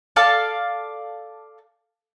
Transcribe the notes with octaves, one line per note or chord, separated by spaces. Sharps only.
A4 D5 F5 A5